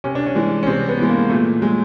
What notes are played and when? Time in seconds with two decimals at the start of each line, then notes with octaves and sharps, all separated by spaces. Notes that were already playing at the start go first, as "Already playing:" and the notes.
0.04 C3 C#4
0.15 D4
0.26 C#4
0.35 E3 G#3
0.63 C#4
0.66 C3 C4
0.88 B3
0.99 E3 G#3
1.09 A#3
1.30 A#2 A3
1.62 F#3 G#3